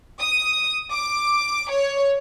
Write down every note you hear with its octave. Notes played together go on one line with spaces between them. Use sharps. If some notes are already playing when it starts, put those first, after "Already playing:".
D#6
D6
C#5